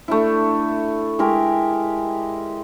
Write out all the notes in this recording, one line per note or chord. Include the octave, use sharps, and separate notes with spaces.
A3 D4 E4
G#3 E4 G4 A#4